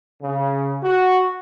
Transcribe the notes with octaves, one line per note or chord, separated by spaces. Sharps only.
C#3
F#4